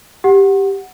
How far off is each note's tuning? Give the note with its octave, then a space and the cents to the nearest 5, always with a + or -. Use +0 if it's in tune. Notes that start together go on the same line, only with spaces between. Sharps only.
G4 +0 F#5 +0